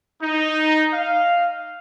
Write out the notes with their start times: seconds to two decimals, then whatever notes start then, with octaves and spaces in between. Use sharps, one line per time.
0.22 D#4
0.93 F5